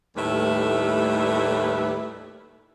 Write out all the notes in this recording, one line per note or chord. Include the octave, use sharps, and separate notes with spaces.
D#2 A2 G3 A3 E4 B4